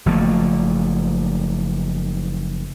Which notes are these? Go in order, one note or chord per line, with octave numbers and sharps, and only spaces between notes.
F#1 F3 A3 A#3